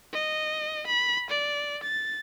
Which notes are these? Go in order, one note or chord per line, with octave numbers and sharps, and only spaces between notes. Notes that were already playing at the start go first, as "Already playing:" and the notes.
D#5
B5
D5
A6